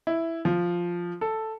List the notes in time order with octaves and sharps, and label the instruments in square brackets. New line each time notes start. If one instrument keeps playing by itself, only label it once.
[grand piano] E4
F3
A4